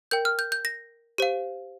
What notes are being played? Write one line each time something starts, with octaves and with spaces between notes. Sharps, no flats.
A#4 G5 G6
F6
G6
G6
A#6
G4 C5 F5